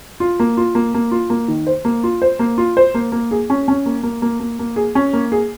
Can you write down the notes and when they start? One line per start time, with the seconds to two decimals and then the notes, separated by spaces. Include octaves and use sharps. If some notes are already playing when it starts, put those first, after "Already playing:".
0.20 F4
0.40 A#3
0.57 F4
0.75 A#3
0.94 A#3
1.11 F4
1.30 A#3
1.48 D#3
1.67 C5
1.85 A#3
2.04 F4
2.22 C5
2.39 A#3
2.58 F4
2.77 C5
2.94 A#3
3.12 A#3
3.31 G#4
3.50 C#4
3.68 C#4
3.86 A#3
4.03 A#3
4.22 A#3
4.40 A#3
4.59 A#3
4.76 G#4
4.95 C#4
5.13 A#3
5.32 G#4